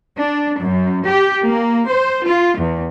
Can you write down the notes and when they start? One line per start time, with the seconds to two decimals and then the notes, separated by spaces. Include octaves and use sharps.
0.18 D4
0.60 F#2
1.04 G4
1.46 A#3
1.87 C5
2.28 F4
2.60 E2